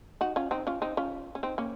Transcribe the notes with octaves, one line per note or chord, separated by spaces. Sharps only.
D#4 F#4
C#4 F4
C4 D#4
C#4 F4
C4 D#4
C#4 F4
C#4
C4 D#4
A#3 C#4